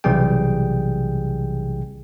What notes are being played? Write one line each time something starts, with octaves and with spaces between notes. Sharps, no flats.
B1 C3 E3 G3 G#4 G5